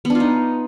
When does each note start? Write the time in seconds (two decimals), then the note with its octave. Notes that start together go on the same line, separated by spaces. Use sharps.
0.05 B3
0.10 D4
0.15 F4
0.20 D#4